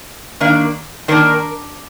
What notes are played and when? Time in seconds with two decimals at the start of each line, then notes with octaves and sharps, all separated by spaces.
0.40 D#3 A#3 D4
1.08 D#3 A#3 D4 A#4